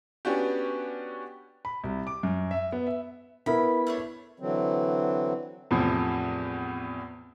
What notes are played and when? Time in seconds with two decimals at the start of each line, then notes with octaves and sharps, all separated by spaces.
0.25 B3 C#4 D4 F#4 G4
1.65 B5
1.84 C2
2.07 D6
2.23 F#2
2.51 E5
2.72 B3
2.87 E5
3.46 B3 E4 A#4 B5
3.87 A3 D4 C#5
4.40 D3 E3 F#3 C4
5.71 E2 A2 C3 F3